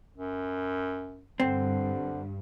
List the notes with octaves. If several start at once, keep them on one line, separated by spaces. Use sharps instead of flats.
F#2
G2 D3 C4